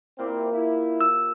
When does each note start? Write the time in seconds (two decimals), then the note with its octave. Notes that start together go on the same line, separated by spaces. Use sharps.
0.19 A#2 A#3 C4 E4 G4
0.53 E4
1.01 E6